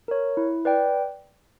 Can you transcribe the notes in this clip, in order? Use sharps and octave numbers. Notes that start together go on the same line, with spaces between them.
A#4 C#5
E4
B4 D5 G5